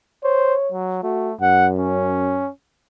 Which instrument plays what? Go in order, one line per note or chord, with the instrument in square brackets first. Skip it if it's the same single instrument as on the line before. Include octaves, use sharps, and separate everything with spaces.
[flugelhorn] C5 [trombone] C#5
[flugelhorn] F#3
[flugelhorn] A3 [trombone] F#4
[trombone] F#2 [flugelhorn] F#5
[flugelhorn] C#4